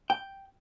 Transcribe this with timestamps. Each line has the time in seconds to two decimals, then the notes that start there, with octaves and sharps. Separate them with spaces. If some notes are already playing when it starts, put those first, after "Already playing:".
0.10 G5